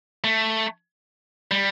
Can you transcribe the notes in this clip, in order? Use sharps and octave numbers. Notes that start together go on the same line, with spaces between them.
A3
G3